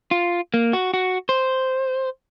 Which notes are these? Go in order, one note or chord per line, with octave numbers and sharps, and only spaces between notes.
F4
A#3
F#4
F#4
C5